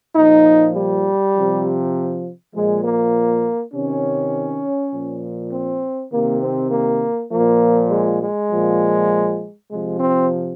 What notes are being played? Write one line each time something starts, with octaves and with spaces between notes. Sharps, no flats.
A#2 F3 D#4
G3
C3 F3
A#2 F3 G#3
A#3
C3 D#3 C#4
A#2 F3
C4
C3 D#3 A#3
C4
A#3
A#2 F3 A#3
G#3
G#3
A#2 F3
C3 F3 G#3
C4